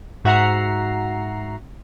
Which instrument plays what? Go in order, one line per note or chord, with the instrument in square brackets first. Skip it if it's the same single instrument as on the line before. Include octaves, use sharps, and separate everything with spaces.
[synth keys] G#2 F#4 E5 F#5 A#5 C7